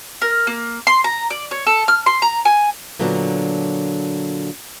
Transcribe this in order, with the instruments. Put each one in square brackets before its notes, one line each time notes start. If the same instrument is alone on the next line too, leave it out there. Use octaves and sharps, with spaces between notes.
[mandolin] A#4
A#3
C6
A#5
D5
C#5
A4
F6
C6
A#5
G#5
[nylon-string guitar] A#2 D3 F#3 B3 D4